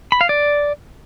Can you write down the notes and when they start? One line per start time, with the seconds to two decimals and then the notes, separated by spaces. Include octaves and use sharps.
0.12 B5
0.21 F5
0.29 D5